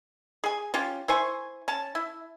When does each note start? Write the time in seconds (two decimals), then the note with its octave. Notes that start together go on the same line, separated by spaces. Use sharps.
0.44 G#4 G#5
0.74 C#4 F4 G4
1.08 E4 C5 G#5 C#6
1.68 C#4 A5
1.95 E4